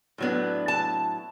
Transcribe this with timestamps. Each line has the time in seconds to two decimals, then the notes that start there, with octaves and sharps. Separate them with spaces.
0.18 A2 F#3 B3 D4
0.68 A5